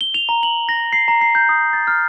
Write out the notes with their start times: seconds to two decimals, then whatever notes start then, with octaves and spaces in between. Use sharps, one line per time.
0.01 G7
0.14 F7
0.29 A#5
0.43 F#7
0.69 A#6
0.93 C7
1.08 A#5
1.21 C7
1.35 G6
1.49 D#6
1.73 A6
1.87 F6